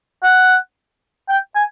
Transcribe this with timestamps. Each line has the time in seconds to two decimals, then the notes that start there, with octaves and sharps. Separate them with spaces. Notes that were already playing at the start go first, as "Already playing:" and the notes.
0.23 F#5
1.29 G5
1.55 G#5